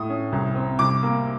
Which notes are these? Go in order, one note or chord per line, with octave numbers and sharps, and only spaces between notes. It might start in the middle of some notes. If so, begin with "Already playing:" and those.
Already playing: A2 D#6
C#4
C2
C4
C2 D6
A#3